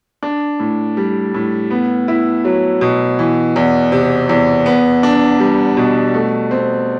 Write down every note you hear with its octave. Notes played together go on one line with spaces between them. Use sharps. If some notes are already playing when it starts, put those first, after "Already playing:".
D4
A2
G3
A2
B3
E4
F#3
B2
E3
E2
C3
E2
B3
D4
G3
B2
A3
C4